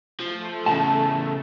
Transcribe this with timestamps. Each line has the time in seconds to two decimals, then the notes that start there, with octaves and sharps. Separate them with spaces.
0.20 F3 A3
0.66 A2 C#3 A5